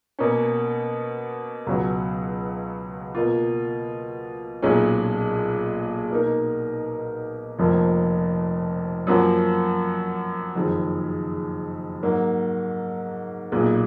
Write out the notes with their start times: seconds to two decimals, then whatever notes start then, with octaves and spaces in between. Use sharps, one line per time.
0.19 B2 A#3 C#4
1.67 C#2 B2 F#3 C#4 F#4
3.15 B2 A#3 F4
4.62 B1 A#2 G#3 C#4
6.11 B2 A#3 D#4 A#4
7.59 F1 F2 F3 A#3
9.07 F#2 F3 A#3 C#4 F#4
10.55 F#1 F2 D#3 G#3
12.03 G#2 F#3 A#3
13.52 B1 A#2 G#3